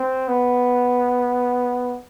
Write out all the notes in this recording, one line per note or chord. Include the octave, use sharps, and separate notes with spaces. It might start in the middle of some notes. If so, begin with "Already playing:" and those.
Already playing: C4
B3